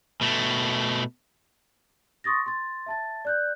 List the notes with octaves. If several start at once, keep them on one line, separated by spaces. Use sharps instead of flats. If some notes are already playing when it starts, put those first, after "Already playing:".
B2 A3
C6 C#6 D#6 A6 A#6
C6 A6
E5 A5 A6
D5 F#6 G6